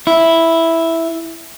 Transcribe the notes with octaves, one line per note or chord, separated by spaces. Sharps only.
E4